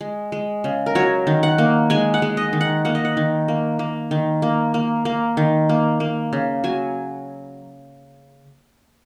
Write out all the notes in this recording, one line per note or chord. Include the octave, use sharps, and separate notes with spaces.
G#3
G#3
C#3
A#4
F#3 C#5
D#3
F#5
A#3
G#3 G#5
F#5
G#3
D#5
D#3
F#5
A#3 F#5
D#5
F#5
D#3
A#3
A#3
D#3
A#3
A#3
A#3
D#3
A#3
A#3
C#3
F#3 G#5